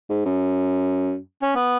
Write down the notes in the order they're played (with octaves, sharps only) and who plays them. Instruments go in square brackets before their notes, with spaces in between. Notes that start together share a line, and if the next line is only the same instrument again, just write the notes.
[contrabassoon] G#2
F#2
[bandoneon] C#4
B3